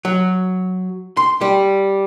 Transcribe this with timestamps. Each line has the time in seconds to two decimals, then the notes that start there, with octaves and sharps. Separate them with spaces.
0.05 F#3
1.17 C6
1.41 G3